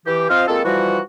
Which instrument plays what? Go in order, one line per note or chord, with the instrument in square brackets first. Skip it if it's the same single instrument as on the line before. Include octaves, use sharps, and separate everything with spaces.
[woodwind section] E3 G4
C4 F4 C5 D#5 F5
G#3 A#3 C4 F4 A4
E3 F3 G3 F#4